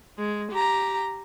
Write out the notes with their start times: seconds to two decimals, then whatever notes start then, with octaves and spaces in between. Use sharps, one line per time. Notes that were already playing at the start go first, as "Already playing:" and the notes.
0.18 G#3
0.51 G4 A#5